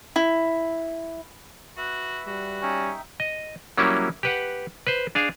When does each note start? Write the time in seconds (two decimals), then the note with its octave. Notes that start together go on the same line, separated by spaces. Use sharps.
0.16 E4
1.77 F#4 B4 E5
2.27 G3 F#4
2.62 C#4 D#4 E5 G5
3.20 D#5
3.77 F#3 G3 A#3 C#4 E4
4.23 G4 B4 F#5
4.87 B4 C5
5.15 D4 G#4 F5